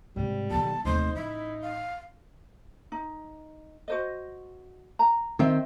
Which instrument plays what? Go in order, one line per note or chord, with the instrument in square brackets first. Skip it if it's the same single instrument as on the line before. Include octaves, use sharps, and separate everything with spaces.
[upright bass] G#2 C3 [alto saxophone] G3
[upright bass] B1 D#3 [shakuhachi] A5
[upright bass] F1 D#2 [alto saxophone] D#4 [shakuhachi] C5
[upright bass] A1 [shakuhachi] E4
[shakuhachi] F5
[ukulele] D#4
F#4 C5 D#5
A#5
[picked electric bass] D#3 C4 [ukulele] C5 D#5 E5